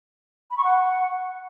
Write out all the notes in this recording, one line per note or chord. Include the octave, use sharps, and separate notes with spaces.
B5
C#6
F#5